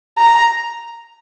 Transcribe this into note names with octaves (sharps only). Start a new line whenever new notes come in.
A#5